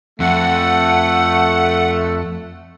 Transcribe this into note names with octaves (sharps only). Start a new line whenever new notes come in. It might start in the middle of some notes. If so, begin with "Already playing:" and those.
F2 A3 F#5